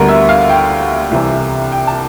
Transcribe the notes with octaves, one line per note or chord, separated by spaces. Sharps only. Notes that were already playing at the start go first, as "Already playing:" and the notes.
Already playing: D2 D3 G3 B3 A#4
E5
F5
G5
C2 C3 E3
G5
A5